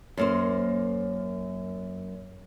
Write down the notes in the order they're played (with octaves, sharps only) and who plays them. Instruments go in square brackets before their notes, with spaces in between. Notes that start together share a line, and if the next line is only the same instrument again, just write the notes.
[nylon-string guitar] F#2 A#3 C5